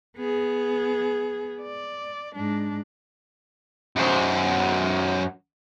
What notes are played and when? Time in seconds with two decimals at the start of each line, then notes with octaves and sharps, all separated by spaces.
0.17 B3 G#4
1.62 D5
2.35 G#2 D4
3.96 F#2 C5